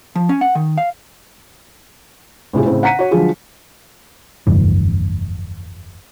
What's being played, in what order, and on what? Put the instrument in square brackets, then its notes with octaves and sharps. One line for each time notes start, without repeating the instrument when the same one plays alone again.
[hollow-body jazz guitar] F3
C#4
F#5
D#3
F5
[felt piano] A2 C3 F4 G#4
A2 C#3 C4
F#5 A#5 B6 C#7 D#7
F#4 C#5
D3 F3 F#3 G#3 F4 G#4
[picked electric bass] F1 D2 G2 E3